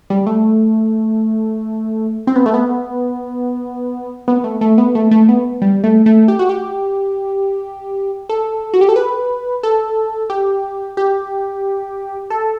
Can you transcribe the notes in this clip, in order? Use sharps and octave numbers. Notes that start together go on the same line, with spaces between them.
G3
A3
C4
B3
A3
B3
B3
A3
A3
B3
A3
A3
B3
G3
A3
A3
G4
F#4
G4
A4
F#4
G4
A4
B4
A4
G4
G4
A4